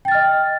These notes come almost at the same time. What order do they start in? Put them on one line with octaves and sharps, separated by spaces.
G5 A6 F6 D#5